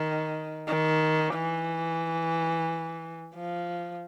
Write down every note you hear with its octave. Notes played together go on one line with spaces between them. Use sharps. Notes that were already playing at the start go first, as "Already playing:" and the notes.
Already playing: D#3
D#3
E3
F3